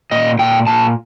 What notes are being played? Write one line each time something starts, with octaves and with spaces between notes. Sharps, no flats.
A#2 D#5
A#2 G5
A#2 A5